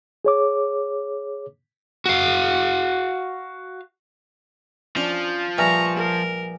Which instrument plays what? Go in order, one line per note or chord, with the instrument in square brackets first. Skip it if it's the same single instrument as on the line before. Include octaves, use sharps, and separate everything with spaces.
[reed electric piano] G#4 C#5 D6
[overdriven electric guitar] F#4 F5
[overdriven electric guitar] F3 [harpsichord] C#4 D4
[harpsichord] A#1 G3 E5 [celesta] B4 G#5 F6 [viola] A#5 C#6
[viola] A#4